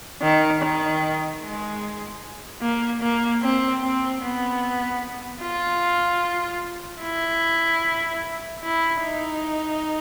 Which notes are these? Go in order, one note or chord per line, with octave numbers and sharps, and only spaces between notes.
D#3
D#3
G#3
A#3
A#3
C4
C4
B3
F4
E4
E4
D#4